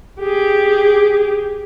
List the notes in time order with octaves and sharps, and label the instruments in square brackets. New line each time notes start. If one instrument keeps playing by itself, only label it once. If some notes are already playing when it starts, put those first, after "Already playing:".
[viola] G4 G#4